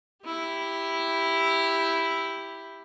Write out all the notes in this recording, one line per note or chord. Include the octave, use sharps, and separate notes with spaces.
E4 G4